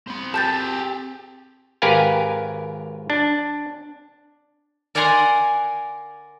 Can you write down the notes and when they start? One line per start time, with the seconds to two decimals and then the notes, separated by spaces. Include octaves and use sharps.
0.07 C4 B5
0.34 G4 G#4 A5 G6 A6
1.82 G#1 G4 A#4 B4 F5 G#5
3.10 D4
4.95 A#4 D5 F#5 G#5 A#5 C6